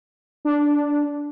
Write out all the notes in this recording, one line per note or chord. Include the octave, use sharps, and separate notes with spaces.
D4